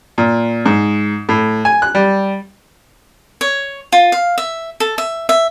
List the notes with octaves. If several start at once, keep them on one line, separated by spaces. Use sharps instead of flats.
A#2
G#2
A2
G#5
F#6
G3
C#5
F4
F5
E5
A4
E5
E5